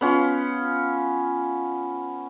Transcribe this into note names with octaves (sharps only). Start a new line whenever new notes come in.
B3 C#4 F4